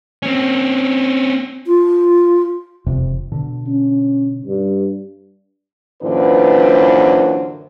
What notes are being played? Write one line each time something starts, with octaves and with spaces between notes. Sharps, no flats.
C4 C#4
F4
E1 F2 C3
B2 D3
C#4
G2
F#2 A#2 D3 E3 B4 C5